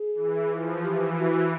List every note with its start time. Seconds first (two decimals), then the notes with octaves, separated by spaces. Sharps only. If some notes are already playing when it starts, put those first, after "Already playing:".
Already playing: G#4
0.15 E3
0.50 F3
0.83 E3 G4
1.19 F#4